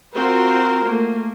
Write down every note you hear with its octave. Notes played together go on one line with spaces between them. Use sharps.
C4 F4 F#4 A#4 C5
A3 A#3